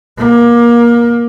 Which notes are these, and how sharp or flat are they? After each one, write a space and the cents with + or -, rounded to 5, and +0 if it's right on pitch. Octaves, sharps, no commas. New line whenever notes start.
A#3 +25